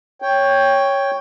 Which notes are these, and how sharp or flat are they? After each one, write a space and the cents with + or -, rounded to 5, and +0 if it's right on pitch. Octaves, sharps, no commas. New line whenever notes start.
C#5 +0 G5 +10